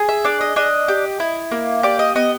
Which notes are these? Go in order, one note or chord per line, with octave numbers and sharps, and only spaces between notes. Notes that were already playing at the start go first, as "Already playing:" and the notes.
Already playing: G#4
E5
D4 D5
D#5
D4 D#5
G4
E4
A#3
G4 D5
D#5
B3 D#5